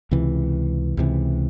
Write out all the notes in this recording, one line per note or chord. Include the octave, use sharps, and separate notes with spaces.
C#2 C3 E3
C#2 C3 E3